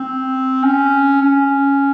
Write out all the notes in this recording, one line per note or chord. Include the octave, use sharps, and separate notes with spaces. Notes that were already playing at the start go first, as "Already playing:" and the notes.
Already playing: C4
C#4
C#4